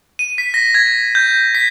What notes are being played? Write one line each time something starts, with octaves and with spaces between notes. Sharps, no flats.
D#7
B6
A#6
G#6
G6
B6